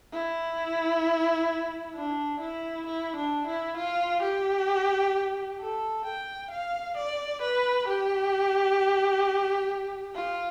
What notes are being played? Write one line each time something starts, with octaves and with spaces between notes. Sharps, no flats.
E4
D4
E4
E4
D4
E4
F4
G4
A4
G5
F5
D5
B4
G4
F4